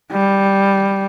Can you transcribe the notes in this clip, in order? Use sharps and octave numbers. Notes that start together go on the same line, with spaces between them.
G3